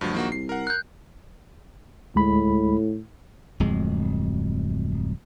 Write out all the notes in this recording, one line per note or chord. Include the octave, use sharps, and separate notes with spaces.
D2 G2 F3 F#3
A#1 D#3 A#3 F#4
C2 C7
A#4 F#5
F#6 G6
D2 A2 G#3 B5
D1 F2 G#3